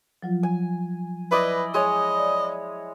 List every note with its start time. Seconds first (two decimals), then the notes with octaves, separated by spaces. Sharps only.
0.23 F3 F#3 F4
0.43 G#5
1.31 E4 B4 D5 D#5
1.74 G#3 C#5 D#5
2.16 D5